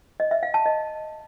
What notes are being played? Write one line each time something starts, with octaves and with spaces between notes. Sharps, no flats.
D#5
E5
F5
A5
D#5